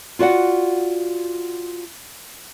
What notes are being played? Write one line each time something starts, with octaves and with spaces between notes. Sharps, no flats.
F4 F#4 D5 F#5